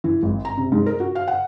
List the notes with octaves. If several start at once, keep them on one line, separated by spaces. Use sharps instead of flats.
E3
G#1
A#5
C3
G#2
A#4
F#4
F5
F#5